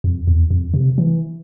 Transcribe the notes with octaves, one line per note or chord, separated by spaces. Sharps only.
F2
E2
F2
C3
E3